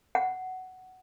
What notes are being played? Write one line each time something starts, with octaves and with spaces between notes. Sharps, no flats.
F#5